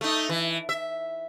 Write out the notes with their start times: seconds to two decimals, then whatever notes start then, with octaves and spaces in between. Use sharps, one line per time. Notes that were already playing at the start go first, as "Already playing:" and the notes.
0.01 A3 D#4
0.29 E3
0.69 E5